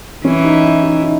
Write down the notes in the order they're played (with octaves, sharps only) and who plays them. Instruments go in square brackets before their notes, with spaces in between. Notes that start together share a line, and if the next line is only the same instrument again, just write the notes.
[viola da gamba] E3 [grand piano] C#4
[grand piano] D#4
E4
D#4
D#4